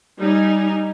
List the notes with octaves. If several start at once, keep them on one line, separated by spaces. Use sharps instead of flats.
G3 D#4 G#5